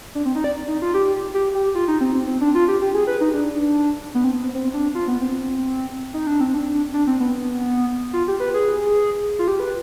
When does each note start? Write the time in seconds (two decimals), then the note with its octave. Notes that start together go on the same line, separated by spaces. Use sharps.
0.15 D4
0.25 C4
0.35 D#4
0.44 D5
0.68 D#4
0.82 F4
0.94 G4
1.34 G4
1.55 G4
1.75 F4
1.88 D#4
2.01 C4
2.14 C4
2.27 C4
2.41 D4
2.55 F4
2.68 G4
2.82 G4
2.94 G#4
3.07 B4
3.21 D#4
3.34 D4
4.15 B3
4.24 C4
4.34 B3
4.44 C4
4.55 C4
4.74 D4
4.95 F4
5.08 B3
5.21 C4
6.14 D#4
6.27 D4
6.41 C4
6.54 D4
6.94 D4
7.07 C4
7.20 B3
8.13 F4
8.28 G4
8.40 B4
8.54 G#4
9.39 F4
9.48 G4
9.60 B4